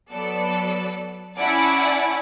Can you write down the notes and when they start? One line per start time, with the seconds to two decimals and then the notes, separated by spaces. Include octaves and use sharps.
0.12 F#3 B3 A4 D5
1.37 C#4 E4 D5 F#5 G#5 A5